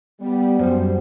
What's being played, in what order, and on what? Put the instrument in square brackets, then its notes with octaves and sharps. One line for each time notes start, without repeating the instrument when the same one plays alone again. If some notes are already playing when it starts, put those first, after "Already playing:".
[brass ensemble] G3 [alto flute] B3
[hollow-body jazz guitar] F#2 G3 [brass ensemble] C5